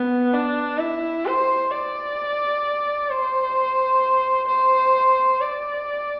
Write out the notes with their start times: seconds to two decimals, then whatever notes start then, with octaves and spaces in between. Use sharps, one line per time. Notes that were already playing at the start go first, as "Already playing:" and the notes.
Already playing: B3
0.33 D4
0.78 E4
1.26 C5
1.71 D5
3.09 C5
4.48 C5
5.41 D5